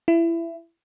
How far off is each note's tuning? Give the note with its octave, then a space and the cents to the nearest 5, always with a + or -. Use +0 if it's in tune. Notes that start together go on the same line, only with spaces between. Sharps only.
E4 +20